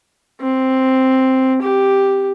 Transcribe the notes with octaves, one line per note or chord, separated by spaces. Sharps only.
C4
G4